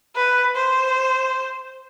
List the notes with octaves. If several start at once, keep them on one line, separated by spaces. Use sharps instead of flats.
B4
C5